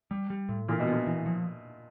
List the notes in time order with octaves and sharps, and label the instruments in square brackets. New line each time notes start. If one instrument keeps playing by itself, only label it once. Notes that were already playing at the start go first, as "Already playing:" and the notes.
[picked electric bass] G3
G3
A2
[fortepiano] A#2 [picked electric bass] E3
[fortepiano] B2
[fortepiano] A#2 [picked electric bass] B3
[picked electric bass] E3
F3